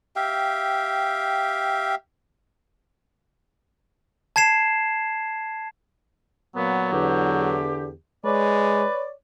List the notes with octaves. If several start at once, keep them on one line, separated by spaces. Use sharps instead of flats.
G4 E5 F5 G5
A5 G#6 C7 E7
A#2 F#3 A#3 B3
E2 D3 G4
G#3 B4 C#5 D5